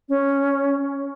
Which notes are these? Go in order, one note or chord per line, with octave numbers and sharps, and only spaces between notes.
C#4